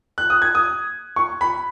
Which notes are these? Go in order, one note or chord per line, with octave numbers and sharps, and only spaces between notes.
F#6
D#6
G#6
D#6
C#6
B5